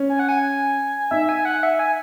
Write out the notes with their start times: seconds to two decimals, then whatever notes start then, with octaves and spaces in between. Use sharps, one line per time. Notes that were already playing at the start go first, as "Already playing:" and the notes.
Already playing: C#4
0.09 G#5
0.19 F#5
0.29 G#5
1.11 D#4 E5
1.29 G#5
1.45 F#5
1.63 E5
1.79 G#5